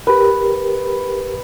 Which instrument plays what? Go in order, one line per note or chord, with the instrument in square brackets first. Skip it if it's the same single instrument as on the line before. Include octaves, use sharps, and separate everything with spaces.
[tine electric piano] G4 A#4 [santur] B4